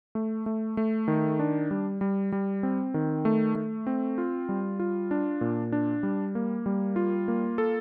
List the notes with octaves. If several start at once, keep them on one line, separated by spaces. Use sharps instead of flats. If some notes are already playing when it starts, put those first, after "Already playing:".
A3
A3
A3
D#3
D4
G3
G3
G3
C4
D#3
A3
A3
C4
F4
G3
F4
D4
A#2
D4
G3
A#3
G3
F4
A#3
A4